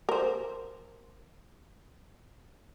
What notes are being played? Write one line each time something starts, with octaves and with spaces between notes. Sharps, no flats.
A#4 C5